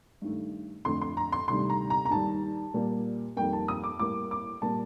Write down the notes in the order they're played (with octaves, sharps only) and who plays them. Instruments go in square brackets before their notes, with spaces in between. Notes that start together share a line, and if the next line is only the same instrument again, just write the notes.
[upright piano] G2 D#3 A3
F2 D3 A3 C6
C6
A#5
C6
D2 C3 D#3 G3 C6
A#5
A#5
A#5
D#2 D#3 G3 A5
A#2 G3 A#3
F2 D#3 G3 A#3 G5
A5
D#6
D6
A2 G3 A#3 D6
D6
A#2 G3 A#3 A5